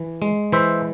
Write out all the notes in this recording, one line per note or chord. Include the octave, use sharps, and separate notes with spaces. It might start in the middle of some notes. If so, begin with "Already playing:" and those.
Already playing: E3
G#3
E3 C5 E5